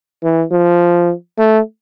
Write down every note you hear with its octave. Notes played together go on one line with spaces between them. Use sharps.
E3
F3
A3